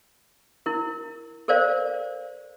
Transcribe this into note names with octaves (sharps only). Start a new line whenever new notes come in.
E4 A#4
A4 A#4 C5 D5 F5